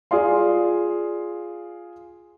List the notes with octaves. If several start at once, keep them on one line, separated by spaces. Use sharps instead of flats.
F4 G#4 D5 F5 C6